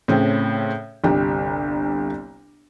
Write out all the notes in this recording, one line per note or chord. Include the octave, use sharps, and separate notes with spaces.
A2 C#3 C4 C#4
G1 C2 G4